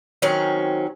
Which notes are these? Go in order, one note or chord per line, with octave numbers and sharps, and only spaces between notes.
D#3 F#3 C4 C#4